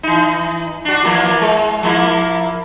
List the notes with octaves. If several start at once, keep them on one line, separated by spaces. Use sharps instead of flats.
E3 D#4
D4 F#4
E3 F3 A#3
G#3
F3 A#3 E4